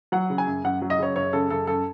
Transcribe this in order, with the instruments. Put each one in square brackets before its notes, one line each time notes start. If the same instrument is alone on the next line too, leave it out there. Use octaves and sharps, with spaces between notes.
[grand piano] F#3 F#5
C#3
G#5
F#2
F#2 F#5
F#3
D#5
C#3 C#5
F#2 C#5
C#3 A4
F#2 A4
F#2 A4